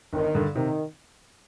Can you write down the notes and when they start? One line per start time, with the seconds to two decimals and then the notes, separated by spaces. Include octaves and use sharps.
0.13 G1 D#3
0.35 G2 D3
0.55 C3 D#3